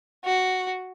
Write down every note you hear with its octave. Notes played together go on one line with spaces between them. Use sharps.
F#4